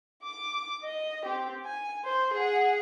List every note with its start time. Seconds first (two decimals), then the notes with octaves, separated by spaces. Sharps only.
0.24 D6
0.82 D#5
1.24 C4 G4
1.66 G#5
2.05 C5
2.34 G#4 F#5